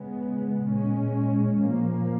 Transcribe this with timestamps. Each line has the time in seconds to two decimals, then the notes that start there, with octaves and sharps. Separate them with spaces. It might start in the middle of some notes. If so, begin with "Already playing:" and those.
Already playing: C#3 G#3 B3
0.67 A#2 G#3 C#4
1.60 A#2 F3 A#3